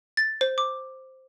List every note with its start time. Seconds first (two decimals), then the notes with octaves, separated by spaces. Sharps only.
0.17 A6
0.41 C5
0.58 D6